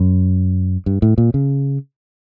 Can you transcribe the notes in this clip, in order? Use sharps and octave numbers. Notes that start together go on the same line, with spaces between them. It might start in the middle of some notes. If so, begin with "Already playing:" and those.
Already playing: F#2
G2
A2
A#2
C#3